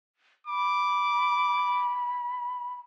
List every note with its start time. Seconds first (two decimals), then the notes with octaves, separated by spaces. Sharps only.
0.47 B5 D6